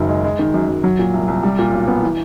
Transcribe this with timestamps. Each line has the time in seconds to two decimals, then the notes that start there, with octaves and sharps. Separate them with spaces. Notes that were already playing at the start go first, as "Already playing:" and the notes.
Already playing: F#1 F#2 D#3
0.09 G#3
0.24 G#3
0.39 D#3
0.54 F#2
0.69 F#2
0.84 F#3
0.99 A#2
1.14 C2
1.28 C2
1.43 G3
1.59 A#2
1.73 B1
1.88 B3
2.03 E3